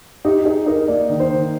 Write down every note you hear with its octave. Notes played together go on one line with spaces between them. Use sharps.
D#4 G4
D#4 G#4
D#4 A#4
A#3 D5
D#3
C5
D#3